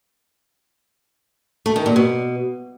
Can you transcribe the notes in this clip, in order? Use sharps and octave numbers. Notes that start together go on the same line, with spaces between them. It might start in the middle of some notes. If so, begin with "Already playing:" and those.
A3
D#3
A#2
B2